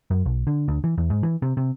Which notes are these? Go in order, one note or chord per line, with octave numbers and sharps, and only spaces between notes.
F#2
B1
D3
D2
E3
E2
G#2
E3
C3
C3